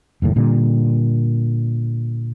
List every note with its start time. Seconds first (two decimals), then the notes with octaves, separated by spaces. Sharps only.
0.22 F#1 D#2 A2
0.36 A#2 D3 G3